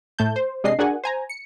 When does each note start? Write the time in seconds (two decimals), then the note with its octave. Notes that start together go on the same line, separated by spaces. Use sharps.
0.19 A2 A3 A5 G6
0.36 C5
0.64 C3 G#3 D4 D#5 C7
0.79 D4 F#4 G#4 A#4 F#5 G#5
1.04 C5 G#5 A#5
1.29 C#7